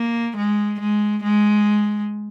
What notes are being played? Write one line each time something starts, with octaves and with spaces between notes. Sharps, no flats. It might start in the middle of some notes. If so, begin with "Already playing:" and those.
Already playing: A#3
G#3
G#3
G#3